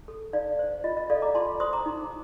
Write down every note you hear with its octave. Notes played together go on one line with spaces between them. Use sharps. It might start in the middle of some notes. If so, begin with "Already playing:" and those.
Already playing: D#4
A4
D#4 D5 F5
C5
F4 D#5
D#5
A4 D5 F5
A#5 D6
F4 A5 C6
C5 C6 D#6
A#5 D6
D#4